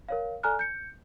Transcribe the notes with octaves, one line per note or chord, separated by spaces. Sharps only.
A#4 C#5 F5
A4 D5 G#5 A#5 F6 F#6
G6 C#7